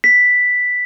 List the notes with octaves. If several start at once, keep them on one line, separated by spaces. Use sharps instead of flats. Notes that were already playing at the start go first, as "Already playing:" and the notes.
B6